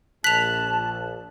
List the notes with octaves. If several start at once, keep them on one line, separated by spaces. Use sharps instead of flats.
A#1 A5 F#6 B6 F7